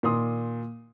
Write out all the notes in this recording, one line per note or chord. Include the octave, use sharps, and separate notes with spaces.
A#2 D#3 C6 D#6